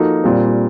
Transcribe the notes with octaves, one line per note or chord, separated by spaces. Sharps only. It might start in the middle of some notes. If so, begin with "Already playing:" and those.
Already playing: F3 A#3 D#4 F#4 A4
A#2 G3 C4